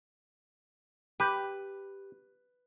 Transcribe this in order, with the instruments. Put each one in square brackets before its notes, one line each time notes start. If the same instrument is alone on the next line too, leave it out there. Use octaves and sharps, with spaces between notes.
[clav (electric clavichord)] G4 [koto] B4